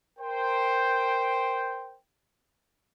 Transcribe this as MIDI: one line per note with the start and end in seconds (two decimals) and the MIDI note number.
0.19 1.98 70
0.19 1.98 72
0.19 1.98 79